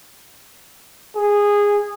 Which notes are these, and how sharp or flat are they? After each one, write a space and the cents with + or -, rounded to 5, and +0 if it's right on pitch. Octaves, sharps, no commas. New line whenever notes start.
G#4 -15